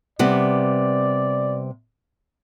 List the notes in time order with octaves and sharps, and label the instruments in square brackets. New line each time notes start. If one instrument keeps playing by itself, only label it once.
[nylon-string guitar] C3 G3 B3 [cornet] D5